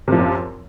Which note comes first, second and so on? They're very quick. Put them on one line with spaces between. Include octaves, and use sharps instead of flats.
C3 F3 F#2